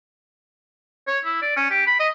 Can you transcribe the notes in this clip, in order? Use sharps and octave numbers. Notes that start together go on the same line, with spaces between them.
C#5
E4
D5
C#4
G4
B5
D#5